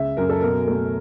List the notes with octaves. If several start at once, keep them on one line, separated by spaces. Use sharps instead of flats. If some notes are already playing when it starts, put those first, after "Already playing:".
Already playing: C#2 C#3 E5
F#2 A#4
A4
B2 A#4
A3